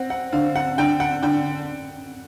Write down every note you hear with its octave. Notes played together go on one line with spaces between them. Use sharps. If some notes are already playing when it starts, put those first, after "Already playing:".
Already playing: C4 F#5
F#5
D3 F5
F#5
D3 G5
F#5
D3 G5